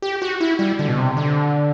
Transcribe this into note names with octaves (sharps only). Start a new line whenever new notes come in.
G4
F#4
E4
G3
D3
B2
C3
D3